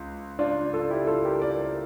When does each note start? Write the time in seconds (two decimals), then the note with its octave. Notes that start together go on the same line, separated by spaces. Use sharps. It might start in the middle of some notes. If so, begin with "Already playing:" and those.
Already playing: C#2
0.39 D4 F4
0.74 F4 A4
0.90 E4 G4
1.07 F4 A4
1.25 G4 A#4
1.42 A#4 D5